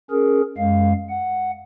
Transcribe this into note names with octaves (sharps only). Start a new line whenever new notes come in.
C#4 G#4 A#4
F#2 G#3 F5
F#5